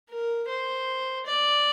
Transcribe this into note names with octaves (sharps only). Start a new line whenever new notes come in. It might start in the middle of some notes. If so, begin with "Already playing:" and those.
A#4
C5
D5